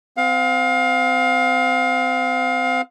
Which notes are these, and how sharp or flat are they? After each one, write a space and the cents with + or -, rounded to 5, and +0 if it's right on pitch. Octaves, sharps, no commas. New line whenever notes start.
C4 -25 F5 +25